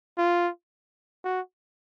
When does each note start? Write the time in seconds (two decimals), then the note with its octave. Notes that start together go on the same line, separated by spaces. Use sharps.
0.17 F4
1.24 F#4